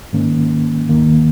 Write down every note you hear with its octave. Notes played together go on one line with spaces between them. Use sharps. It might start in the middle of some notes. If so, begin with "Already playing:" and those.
G#2 D#3 A#3 C#4
D#2 D#3 A#3